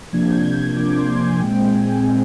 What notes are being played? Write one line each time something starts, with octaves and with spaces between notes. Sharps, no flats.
C3 F3 A#3 D4 G#6
G6
G#6
C3 F3 A#3 D4 D6
C6
G#5
A#2 G#3 C4 G5
G#5
A#2 G#3 C4